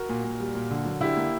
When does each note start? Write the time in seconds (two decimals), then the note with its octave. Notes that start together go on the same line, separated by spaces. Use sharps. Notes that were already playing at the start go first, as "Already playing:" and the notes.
Already playing: F#4 A#4
0.09 A#2
0.24 A#2
0.40 G3
0.55 A#2
0.71 D3
0.85 F#3
1.00 D3 E4 G4
1.17 A#3